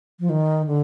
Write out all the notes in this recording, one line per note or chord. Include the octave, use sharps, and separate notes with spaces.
F3
D#3
D3